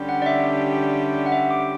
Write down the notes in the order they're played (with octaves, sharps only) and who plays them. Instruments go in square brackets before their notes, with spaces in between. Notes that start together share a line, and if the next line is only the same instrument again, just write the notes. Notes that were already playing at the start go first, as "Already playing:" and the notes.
Already playing: [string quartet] D3 G3 C#4 G4
[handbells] F#5
D5
E5
F#5
E5
D6